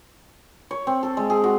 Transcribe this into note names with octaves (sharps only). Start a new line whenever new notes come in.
C#5
C4
A4
G#3
G#4
F#4